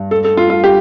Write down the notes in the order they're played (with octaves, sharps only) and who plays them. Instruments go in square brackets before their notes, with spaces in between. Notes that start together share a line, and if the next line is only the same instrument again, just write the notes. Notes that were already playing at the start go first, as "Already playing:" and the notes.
Already playing: [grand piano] G2
[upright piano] A4
A4
F4
F4
G4